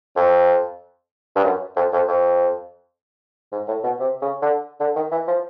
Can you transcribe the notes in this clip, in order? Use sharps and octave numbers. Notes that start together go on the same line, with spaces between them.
F2
G2
F#2
F2
F2
F2
G#2
A2
B2
C3
C#3
D3
D3
D#3
E3
F3